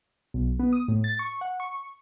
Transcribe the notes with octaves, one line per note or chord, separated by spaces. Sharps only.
B1
B3
D#6
A2
A6
C#6
F#5
C#6